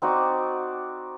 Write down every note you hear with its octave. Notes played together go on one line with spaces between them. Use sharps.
C4 D#4 F#4 D5